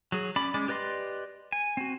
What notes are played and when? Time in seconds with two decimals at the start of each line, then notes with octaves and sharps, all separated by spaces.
0.12 F#3 G#4
0.36 C#4 D5 B5 D6
0.54 G#3 C#4 D5 D6
0.68 G4 B4 D5 D#5 C6
1.52 G#5
1.77 C4 F#4